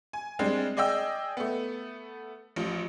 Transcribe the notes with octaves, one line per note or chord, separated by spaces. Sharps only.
G#5
G3 G#3 C4 D4
G#4 D5 D#5 G5 E6
A3 B3
A1 F3